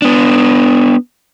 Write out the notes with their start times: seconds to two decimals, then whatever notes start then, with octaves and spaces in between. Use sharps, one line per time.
0.02 B3 D4